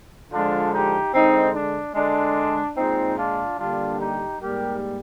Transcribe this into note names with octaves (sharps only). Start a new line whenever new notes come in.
D3 F3 G#3 D4 F4
D#4 G4
D3 G#3 C4 D#4
D4
D3 G#3 D4
A#2 G#3 C4 D#4
D4 F4
D3 G3 A#3 D4 F4
D#4 G4
G#2 G3 A#3 G4 A#4